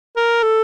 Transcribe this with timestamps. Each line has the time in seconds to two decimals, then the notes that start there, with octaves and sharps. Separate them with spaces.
0.16 A#4
0.43 A4